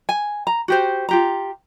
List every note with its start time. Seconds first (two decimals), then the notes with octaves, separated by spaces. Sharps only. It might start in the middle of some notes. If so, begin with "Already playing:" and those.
0.09 G#5
0.47 A#5
0.68 F#4 G4 C5
1.09 F4 G4 A#5